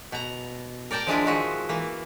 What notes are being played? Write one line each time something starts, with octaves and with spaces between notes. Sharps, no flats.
B2 A#5
A#4 D5 G5 A5 A#5
F3 G#3 D4 E4
D#3 F3 G#3 F#4 E5 F#5
E3 A#3